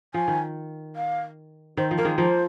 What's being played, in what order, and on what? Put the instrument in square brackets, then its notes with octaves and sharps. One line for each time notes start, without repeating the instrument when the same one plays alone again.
[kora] F3 [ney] G#5
[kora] D#3
[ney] F5
[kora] D#3 [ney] C5
[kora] F3
[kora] A#3 [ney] A#4
[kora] D#3 G#3
[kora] F3 A#3 [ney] C5